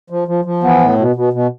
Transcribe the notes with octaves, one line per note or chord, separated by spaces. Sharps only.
F3
F3
F3
E3 B3
A2
B2
B2
B2